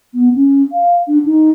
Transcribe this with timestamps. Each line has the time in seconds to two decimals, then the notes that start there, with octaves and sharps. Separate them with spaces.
0.14 B3
0.36 C#4
0.72 F5
1.08 D4
1.25 D#4